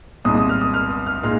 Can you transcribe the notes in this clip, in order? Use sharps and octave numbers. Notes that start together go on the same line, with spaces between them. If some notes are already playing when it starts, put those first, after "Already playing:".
C2 A#2 G#3 D#4 D#6
D#6
F6
D#6
F6
D#6
F6
A#2 G#3 D#4 F6